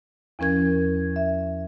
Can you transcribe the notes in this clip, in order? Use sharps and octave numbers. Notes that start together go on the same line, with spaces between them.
E2 F3 C#4 A#4 G#6
E5